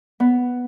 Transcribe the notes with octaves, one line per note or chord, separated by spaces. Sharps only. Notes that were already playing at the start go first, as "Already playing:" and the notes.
B3